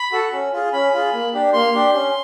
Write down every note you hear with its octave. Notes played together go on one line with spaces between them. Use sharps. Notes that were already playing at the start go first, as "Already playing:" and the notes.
Already playing: B5
F#4 A4
C#4
F4 G#4
C#4 B5
F4 G#4
A#3
D4 G4
A#3 C6
D4 G4
C#4